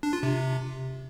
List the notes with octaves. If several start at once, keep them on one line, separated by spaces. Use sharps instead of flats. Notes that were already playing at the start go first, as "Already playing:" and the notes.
D4
F4
C3